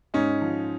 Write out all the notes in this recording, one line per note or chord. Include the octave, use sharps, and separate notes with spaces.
G#2 C#4 D#4
F3